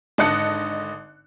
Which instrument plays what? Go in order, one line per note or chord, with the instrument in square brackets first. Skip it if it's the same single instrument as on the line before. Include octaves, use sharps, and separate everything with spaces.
[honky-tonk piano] G#1 D3 D#5 A5 F#6 C#7